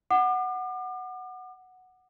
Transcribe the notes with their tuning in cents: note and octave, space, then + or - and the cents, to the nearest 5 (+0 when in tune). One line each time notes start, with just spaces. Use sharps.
F#5 +0 D6 +40